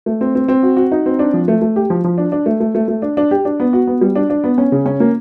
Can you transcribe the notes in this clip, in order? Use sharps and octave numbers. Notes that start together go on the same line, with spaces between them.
A3
C4
C4
C4
F#4
F#4
D#4
C4
D4
F3
A3
A3
G4
F3
F3
D4
D4
A3
A3
A3
A3
D4
D4
G4
D4
B3
F#4
B3
G3
D4
D4
B3
C#4
C#3
C#4
A#3